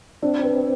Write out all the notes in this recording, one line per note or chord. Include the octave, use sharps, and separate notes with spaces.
C4 D4
B4